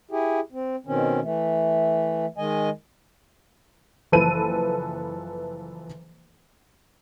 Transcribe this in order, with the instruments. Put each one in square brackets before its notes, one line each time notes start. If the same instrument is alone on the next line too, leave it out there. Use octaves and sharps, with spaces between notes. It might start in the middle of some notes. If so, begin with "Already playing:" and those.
[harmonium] E4 G4 G#4
C4
B2 D#3 C4 C#4
E3 A3
D#3 G#3 D#5 G#5
[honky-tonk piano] F#1 E3 F3 A4 B4 D#7